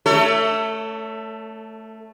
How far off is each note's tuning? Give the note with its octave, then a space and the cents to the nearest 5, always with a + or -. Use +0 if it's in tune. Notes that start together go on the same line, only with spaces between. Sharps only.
A3 +0 A4 +25 C#5 +30